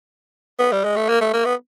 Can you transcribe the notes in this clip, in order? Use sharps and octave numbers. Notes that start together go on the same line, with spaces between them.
B3
G3
G#3
A3
A#3
A3
A#3
B3